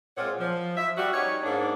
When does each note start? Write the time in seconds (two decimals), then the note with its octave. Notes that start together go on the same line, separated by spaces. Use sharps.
0.18 A#2 G#3 C4 F4 C#5 F#5
0.40 F3
0.77 E5
0.97 G3 F#4
1.12 C#4 D#4 G4 C#5
1.43 G#2 A#3 D4